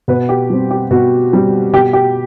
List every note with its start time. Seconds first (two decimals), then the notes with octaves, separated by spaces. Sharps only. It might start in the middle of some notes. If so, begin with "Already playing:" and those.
0.08 B2 B4
0.29 G4
0.50 G3 C4
0.71 G4
0.91 B2 F#4
1.32 G3 C4
1.73 B2 G4
1.93 G4